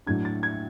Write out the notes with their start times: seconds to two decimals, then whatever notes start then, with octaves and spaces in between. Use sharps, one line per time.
0.06 A2 F#3 A3 D4 G#6
0.25 A6
0.43 G#6